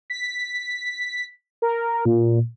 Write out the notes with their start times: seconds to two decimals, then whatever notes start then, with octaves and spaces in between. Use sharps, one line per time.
0.10 B6
1.62 A#4
2.05 A#2